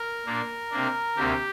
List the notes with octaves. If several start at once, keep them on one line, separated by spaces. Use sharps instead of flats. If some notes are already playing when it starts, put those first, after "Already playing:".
Already playing: A#4
A#2 A#3 D4
C3 A#3 D4
D2 C3 A#3 G4